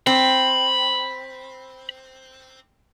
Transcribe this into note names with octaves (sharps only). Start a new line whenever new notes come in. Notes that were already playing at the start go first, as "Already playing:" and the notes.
C4 B5